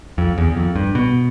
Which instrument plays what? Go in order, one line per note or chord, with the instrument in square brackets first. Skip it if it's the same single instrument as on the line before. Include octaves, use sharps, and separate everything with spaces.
[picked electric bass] F2
E2
E2
F2
G2
B2